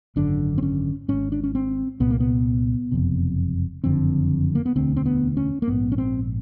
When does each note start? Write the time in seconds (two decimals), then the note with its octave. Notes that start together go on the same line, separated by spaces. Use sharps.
0.16 G#1 F#2 D3 D4
0.58 C4
0.63 C#4
1.08 G#1 G#2 C#4
1.32 D4
1.44 C#4
1.55 C4
2.00 C2 A#2 B3
2.10 A#3
2.20 B3
2.92 F#1 F2 C3
3.84 F#1 F2 D3 C4
4.55 A#3
4.66 B3
4.75 E1 D2 D3 C4
4.97 C4
5.06 B3
5.37 C#4
5.62 A#3
5.68 A#1 G#2 B3
5.92 C#4
5.98 C4